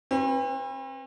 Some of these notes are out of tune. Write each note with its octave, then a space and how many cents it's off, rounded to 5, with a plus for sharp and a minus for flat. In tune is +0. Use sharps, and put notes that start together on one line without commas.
C4 +40 B4 +0